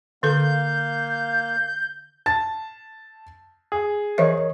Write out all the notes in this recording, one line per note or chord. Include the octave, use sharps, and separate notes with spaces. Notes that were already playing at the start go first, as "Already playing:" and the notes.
D3 A#3 A4 F5 G6
A5 A6
G#4
E3 A#4 C#5 D#5 E5